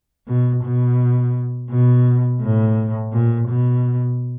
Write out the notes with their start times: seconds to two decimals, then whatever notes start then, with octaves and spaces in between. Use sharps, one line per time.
0.27 B2
0.64 B2
1.70 B2
2.41 A2
3.12 A#2
3.48 B2